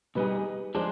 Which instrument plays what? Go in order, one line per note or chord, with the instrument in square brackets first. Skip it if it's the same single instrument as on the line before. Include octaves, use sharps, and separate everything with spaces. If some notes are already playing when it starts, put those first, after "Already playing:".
[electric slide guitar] B2 G3 B3 D#4 G#4 [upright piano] G4 B4
[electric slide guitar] F3 G#3 D4 [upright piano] G#4 C5